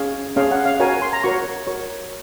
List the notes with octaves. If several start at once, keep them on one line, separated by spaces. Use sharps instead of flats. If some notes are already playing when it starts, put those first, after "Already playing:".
Already playing: C#4 G#4 C#5 F5
C#4 G#4 C#5 F5
F#5
F5
F#4 A#4 C#5 G#5
C6
A#5
F#4 A#4 C#5 C#6
F#4 A#4 C#5 C#6